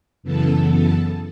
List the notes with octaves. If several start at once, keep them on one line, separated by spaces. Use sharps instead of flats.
F#2 C#3 E3 B3 A4 A5